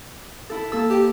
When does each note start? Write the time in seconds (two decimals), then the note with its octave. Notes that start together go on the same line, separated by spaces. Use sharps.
0.50 E4 A4
0.72 A#3 A4 E6
0.90 G4